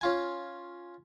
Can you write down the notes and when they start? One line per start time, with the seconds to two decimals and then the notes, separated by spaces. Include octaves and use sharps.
0.01 C#4 F4 G#5